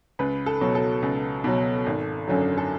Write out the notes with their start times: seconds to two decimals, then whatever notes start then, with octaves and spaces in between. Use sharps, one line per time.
0.19 C#2 B4
0.46 A4
0.61 B2 F#3
0.75 A4
1.02 C#2
1.44 B2 F#3
1.86 G#1
2.28 F#2 D3 F#3
2.58 A4